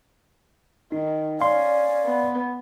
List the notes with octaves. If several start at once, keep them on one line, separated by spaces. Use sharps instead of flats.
D#3 D#4
C#4 D5 F5 C6
B3